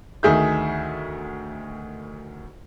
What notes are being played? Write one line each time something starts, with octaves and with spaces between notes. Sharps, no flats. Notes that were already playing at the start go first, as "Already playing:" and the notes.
D2 D#3 G#4 E5 G6